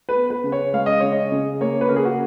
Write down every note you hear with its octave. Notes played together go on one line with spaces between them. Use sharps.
B4
B3
B4
C#3
C#5
G#3 F5
D#5
C#3 C#5
D#5
C#3
A#3 C#5
B4
C#3 A#4
G#4
F#4